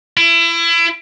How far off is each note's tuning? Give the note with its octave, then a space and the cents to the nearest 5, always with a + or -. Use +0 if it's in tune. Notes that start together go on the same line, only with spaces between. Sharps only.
E4 +30